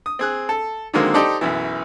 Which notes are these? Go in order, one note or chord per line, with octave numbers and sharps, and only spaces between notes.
D#6
C4 G#4 F#6
A4
D3 D#3 F#3 G#3 A#3 C4
D#4 G4 A4 C5 D5 D#5
B1 F#2 E3